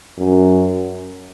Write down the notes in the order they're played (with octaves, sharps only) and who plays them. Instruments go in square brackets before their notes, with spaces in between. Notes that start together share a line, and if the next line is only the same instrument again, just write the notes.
[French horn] F#2